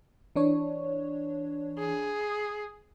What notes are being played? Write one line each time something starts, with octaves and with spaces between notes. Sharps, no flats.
E3 D4 C#5
G#4